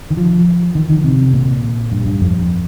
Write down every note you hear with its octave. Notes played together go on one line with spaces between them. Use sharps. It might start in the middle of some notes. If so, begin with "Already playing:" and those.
D#3
F3
D#3
D#3
C3
A#2
G2
G2
F2